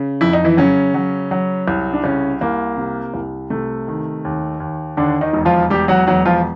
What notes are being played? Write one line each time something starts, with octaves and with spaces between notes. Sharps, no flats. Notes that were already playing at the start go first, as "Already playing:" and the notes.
Already playing: C#3
F2 E4
D#4
E3 E4
C#3 F#3 C#4
F#3
F#3
C2
D4
C2 C#3 C#4
C2 A#3
C3
C2
C3 A3
D#3
D#2
D#2
D#2 D3 D4
D#3 D#4
E1
F3 F4
E1 G3 G4
F#3 F#4
E1 F#3 F#4
F3 F4